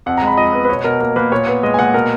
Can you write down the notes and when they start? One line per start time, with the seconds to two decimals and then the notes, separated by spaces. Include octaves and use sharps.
0.06 F2 F#5
0.17 A#5
0.22 G#3 B5
0.37 F3 D#5
0.53 B3
0.65 B4
0.69 B2 C#5
0.84 B2 A#4
1.00 A#3 A#4
1.16 A#3 B4
1.32 A#2 C#5
1.47 B3
1.63 G#3 D#5
1.74 G#5
1.79 A#2 F#5
1.94 B2 A#4